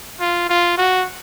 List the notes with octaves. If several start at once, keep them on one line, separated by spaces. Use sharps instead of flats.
F4
F4
F#4